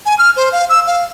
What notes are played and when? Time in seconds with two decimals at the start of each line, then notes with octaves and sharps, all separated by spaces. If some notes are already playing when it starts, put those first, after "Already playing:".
0.06 G#5
0.19 F6
0.37 C5
0.52 F5
0.69 E6
0.87 F5